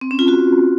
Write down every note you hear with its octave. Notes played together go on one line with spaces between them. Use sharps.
C4
C#4
F4
F#4